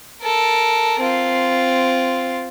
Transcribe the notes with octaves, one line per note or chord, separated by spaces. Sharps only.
A4 A#4
C4 F4